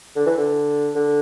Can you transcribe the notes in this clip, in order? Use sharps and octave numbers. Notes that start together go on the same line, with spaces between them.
D3
E3
D3
D3